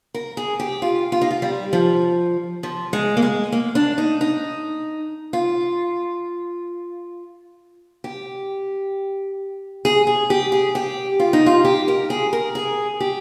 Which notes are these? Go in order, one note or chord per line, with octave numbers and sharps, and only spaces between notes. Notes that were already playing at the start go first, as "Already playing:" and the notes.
A#4
G#4
G4
F4
F4
D#4
F4
G3
F3
F3
G#3
A#3
G#3
A#3
D4
D#4
D#4
F4
G4
G#4
G#4
G4
G#4
G4
F4
D#4
F4
G4
A#4
G#4
A#4
G#4
G4